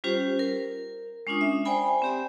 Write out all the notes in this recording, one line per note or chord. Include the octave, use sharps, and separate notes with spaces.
G3 C#4 F4 G4 C5
A#4
G#3 C#4 D4 F4 D#6
E5
C5 D5 G5 G#5 B5
C4 G4 D5